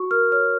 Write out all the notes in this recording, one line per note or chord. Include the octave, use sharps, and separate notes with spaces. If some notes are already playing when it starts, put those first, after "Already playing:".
Already playing: F#4 C#6
A#4 F6
C#5 F6